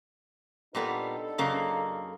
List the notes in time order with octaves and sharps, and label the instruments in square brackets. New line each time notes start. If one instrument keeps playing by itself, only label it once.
[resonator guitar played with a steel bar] A#2 G3 B3 [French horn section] D4 D#4 A4
[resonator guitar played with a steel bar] F#2 C#3 A#3